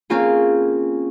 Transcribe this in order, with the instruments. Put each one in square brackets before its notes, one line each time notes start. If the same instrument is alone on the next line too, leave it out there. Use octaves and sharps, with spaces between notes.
[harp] A#3 C4 C#4 F4 G#4